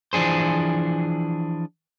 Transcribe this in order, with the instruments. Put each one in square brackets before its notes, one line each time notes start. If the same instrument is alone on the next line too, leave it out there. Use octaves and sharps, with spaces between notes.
[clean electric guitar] E3 F3 D4 G#4 C5